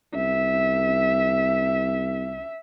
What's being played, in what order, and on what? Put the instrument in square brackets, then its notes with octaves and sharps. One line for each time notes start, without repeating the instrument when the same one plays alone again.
[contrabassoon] C2 [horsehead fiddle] E5